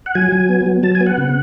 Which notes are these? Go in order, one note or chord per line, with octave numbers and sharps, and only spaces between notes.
F#5
F#3 G#5
F#3
B3
F#3
F#3 A5
G#5
B3
F#5
C#3